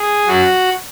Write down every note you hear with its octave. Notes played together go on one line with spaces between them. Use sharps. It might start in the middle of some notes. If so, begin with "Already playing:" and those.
Already playing: G#4
F#2 F#3 F#4